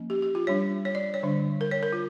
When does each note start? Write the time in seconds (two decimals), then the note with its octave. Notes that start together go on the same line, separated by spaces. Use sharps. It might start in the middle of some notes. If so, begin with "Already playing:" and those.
Already playing: F3 A#3 C#4
0.10 G4
0.22 G4
0.35 F4
0.47 G3 D4 C#5
0.85 C#5
0.95 D5
1.14 C#5
1.23 D3 G3 D4
1.61 A#4
1.71 C#5
1.83 A#4
1.93 F4